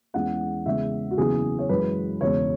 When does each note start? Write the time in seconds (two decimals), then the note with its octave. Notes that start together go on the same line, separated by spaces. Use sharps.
0.14 E2 E3 G#3 C#4 F#5
0.66 E2 C#3 G#3 C#4 E5
1.11 F#4
1.17 F#1 E2 C#3 E3 B3 G#4
1.59 C#5
1.69 F#2 E3 G#3 B4
2.21 E1 E2 C#3 C#5